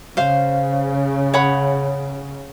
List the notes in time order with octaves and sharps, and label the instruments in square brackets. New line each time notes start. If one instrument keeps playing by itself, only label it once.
[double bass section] C#3 [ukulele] C5 F5
[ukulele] C#5 F#5 B5